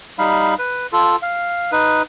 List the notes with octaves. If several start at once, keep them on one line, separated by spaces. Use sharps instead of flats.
G3 D#4 F5 B5
B4
F4 A4
F5
D#4 B4